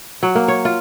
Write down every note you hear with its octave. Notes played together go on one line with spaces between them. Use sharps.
F#3
A#3
C#5
F4